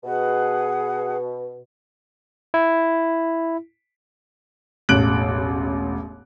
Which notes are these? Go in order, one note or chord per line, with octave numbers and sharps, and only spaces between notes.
B2 G#4 B4 F#5
E4
E1 A1 F#6 D7 F#7